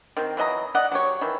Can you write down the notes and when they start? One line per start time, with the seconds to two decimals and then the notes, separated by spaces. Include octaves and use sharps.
0.17 D#3 C4
0.37 E3 F#3 D#5 A#5
0.75 D5 D#5 F#5
0.92 F#3 G4 C#5
1.21 D#3 E3